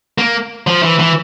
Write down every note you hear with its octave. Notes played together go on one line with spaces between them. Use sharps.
A#3
F3
E3
E3